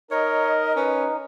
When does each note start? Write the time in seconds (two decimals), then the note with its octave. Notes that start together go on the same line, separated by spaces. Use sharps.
0.11 D#4 A#4 C#5 D#5
0.76 C#4 B4